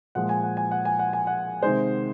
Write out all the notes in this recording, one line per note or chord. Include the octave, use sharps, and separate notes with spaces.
A#2 F3 G#3 F#5
G#5
F#5
G#5
F#5
G#5
F#5
G#5
F#5
C3 D#3 G#3 C5